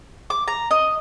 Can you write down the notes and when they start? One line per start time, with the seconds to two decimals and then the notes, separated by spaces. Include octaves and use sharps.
0.30 D6
0.48 A#5
0.71 D#5